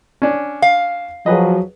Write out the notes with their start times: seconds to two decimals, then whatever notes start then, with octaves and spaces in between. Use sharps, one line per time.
0.22 C#4 D4
0.62 F5
1.26 F3 F#3 G#4 B4 D#5